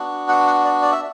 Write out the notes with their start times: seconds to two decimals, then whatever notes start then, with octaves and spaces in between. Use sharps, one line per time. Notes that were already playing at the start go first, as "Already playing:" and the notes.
Already playing: B3 D4 F#4
0.29 F#5
0.47 F#5
0.64 D5
0.82 D5
0.92 E5